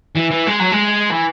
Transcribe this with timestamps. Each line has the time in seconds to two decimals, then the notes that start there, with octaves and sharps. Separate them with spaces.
0.15 E3
0.31 E3
0.47 G#3
0.60 F#3
0.72 G#3
1.10 E3